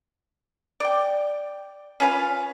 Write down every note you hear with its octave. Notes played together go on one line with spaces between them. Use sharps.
D5 G5
C#4 F4 B4 F5